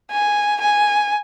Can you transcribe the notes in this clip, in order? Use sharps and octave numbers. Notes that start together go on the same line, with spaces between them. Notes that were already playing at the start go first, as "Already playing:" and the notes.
G#5
G#5